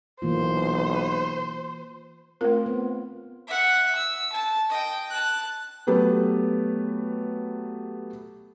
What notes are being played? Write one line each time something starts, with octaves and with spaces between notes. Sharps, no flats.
B1 E3 A#3 F4 C5
A3 C4 F4 A#4
B3
E5 F#5
E6
A5
D#5 G5
A5 F#6
F#3 A3 B3 G4 B4